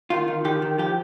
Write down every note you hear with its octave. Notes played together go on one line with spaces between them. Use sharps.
D#3 F4
D#3
D#3 G4
D#3
F3 G4